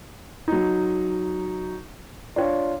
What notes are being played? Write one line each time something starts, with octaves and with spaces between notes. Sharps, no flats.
F#3 D#4
D4 F4 C#5